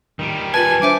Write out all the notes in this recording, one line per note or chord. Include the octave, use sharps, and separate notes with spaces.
D#3 G3
F4 B4 G#5 A5 A6 F#7
D4 C5 E5 G#5 D6